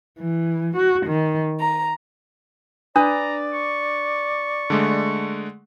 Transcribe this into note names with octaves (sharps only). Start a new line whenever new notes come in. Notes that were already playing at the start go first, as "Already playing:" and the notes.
E3
F#4
D#3
A#5
D4 B4 D5 A#5 D#6
C#6
D3 G#3 A3